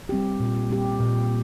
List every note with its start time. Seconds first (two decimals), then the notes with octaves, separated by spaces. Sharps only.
0.09 G3 C4 G4
0.40 A#2
0.70 G3 C4 G4
1.00 A#2